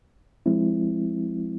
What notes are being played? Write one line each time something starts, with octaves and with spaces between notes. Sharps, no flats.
F3 G#3 C4 E4